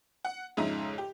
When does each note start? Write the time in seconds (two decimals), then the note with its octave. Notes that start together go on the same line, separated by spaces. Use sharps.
0.25 F#5
0.57 F2 G#2 C#3 D#4 E5 A#5
0.98 G4